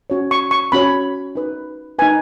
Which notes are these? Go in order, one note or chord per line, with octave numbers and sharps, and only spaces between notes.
C#4 F#4 C#5
C#6
C#6
C#4 F#4 C#5 B5
D#4 B4
D#4 B4 G#5